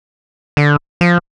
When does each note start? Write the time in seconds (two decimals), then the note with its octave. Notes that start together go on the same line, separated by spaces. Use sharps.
0.57 D3
1.01 F3